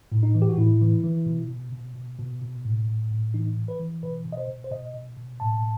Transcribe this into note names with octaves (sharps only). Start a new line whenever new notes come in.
A2
D#4
E3
G4
F#4
A2 E4
E3
E3
B2
B2
B2
B2
B2
B2
A2
A2
A2
E3 D#4
E3
B4
E3
B2 B4
B2
D#5
C5
B2
C5
B2 D#5
B2
B2
A2 A5